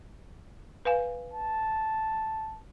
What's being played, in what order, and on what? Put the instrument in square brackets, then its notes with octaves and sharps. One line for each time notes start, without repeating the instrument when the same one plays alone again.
[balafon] B4 F5 G#5
[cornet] A5